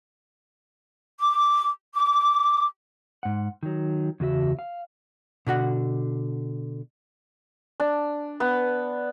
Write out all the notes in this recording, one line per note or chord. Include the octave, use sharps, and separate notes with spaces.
D6
D6
G#2 F#5
D#3 F#3
E2 C#3 F#4 E5
F5
B2 D3 F#4 F#5
D4
B3